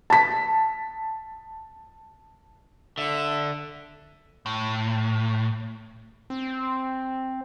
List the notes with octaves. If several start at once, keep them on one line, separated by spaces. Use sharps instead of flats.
A5 B6
D3 E5
A2
C4